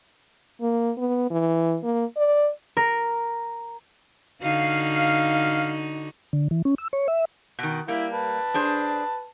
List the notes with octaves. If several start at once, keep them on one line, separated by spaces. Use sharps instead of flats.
A#3
B3
E3
A#3
D5
A#4
D3 D#4 F#4 F5
D3
E3
C#4
E6
C#5
E5
B2 D#3
G3 A#3 E4
B4 A5
D4 G#4 C5